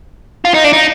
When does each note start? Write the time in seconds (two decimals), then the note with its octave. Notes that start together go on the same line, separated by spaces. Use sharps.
0.45 F4
0.54 D#4
0.64 D4
0.73 D#4